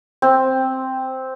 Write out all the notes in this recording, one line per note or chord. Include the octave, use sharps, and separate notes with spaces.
C4